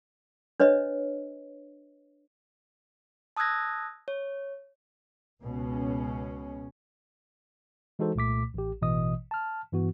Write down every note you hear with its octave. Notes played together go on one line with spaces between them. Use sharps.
D4 B4 C#5 D#5
A5 D#6 E6 F#6 G#6 A#6
C#5
C#2 B2 C#4
E3 G#3 D#4 F#4 A4 C5
C2 A#2 A3 D6 B6
A1 G4
A1 B2 E3 D#5 D#6
A5 F6
G2 E3 B3 F#4